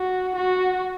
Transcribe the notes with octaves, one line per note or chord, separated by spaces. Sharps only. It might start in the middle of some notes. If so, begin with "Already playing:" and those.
Already playing: F#4
F#4